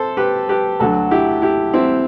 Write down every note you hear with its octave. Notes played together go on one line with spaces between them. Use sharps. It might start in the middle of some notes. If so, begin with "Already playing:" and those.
Already playing: C3 A4 C5
G4 B4
G4 B4
D2 D3 F#3 F#4 A4
E4 G4
E4 G4
C4 E4